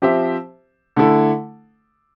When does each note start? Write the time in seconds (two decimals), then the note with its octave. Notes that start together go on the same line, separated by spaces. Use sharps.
0.02 F3 C4 G4 C5 E5
0.96 D3 A3 E4 A4